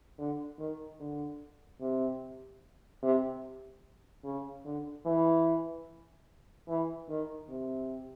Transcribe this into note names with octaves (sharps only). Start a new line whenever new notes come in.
D3
D#3
D3
C3
C3
C#3
D3
E3
E3
D#3
C3